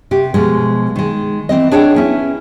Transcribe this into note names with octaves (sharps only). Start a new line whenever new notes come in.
C3 F#4 G4
B2 F3 G#3
D#3 G#3
E3 C4 D#5
D4 G#4 C#5 F#5 G5
B3 C#4 E4